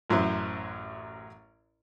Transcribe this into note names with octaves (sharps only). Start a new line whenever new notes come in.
A1 F#2 F#3 E4 C5